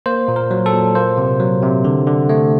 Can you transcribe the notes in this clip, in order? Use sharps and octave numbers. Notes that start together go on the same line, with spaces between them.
A#3 C5
A#2
A#4
F#3
A4
A#2
A#3 C5
C3
F#3
C3
D3
D3
A3